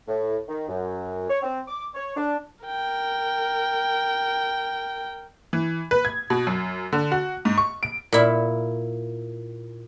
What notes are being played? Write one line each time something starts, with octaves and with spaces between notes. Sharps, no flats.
A2
D#3
F#2
C#5
C4
D6
C#5
D4
A#4 G5
E3
B4
G#6
B2
F#2
D3
F#4
G#2
C#6
D7
A#2 E4